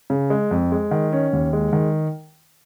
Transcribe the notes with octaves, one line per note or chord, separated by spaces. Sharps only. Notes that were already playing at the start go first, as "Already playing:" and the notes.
C#3
G#3
F2
G#3
D#3
C#4
D#2
G#3
D#3